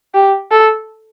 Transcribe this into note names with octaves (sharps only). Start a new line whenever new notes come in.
G4
A4